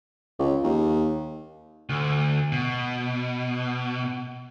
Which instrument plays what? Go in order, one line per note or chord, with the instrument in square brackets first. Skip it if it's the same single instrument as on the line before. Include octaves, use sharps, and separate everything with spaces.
[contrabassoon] C#2
D#2
[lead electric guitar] D2
B2